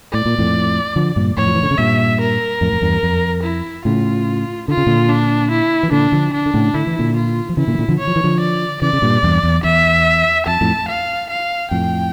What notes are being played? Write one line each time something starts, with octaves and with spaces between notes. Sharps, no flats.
A2 D5
A#2
F2 A2
D3 F3
G2 A#2
F2 A2 C#5
F3
E3
D3
C#3
G2 A#2 E5
A#4
F2 A2
F2
E2 G2
F2
E4
A2 C#3 F4
D3 F4
C#3
A#2 D3
D4
E4
E3
A#2 D3 D4
D3 F3
D4
D3
A2 C#3
D3 E4
E3
A#2 D3
F4
F3
C#3 E3 E4
A#2 D3
E3
A#2 D3
D3 F3
C#5
F3
E3
D3 F3
D5
C#3 E3 D5
C#3
G2 A#2
E2 G2
E2
E2 E5
F2 A5
F2 A2
F5
F5
F2 A2 G5